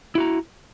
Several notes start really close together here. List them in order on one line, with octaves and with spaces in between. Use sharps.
E4 F#4 A#5